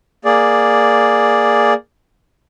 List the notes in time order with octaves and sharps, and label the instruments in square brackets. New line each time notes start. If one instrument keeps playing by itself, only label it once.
[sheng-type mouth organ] A#3 G#4 D5